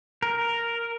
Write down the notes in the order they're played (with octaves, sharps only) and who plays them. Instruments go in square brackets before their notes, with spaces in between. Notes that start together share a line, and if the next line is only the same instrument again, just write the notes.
[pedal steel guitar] A#4